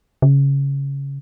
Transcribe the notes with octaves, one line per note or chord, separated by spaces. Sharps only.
C#3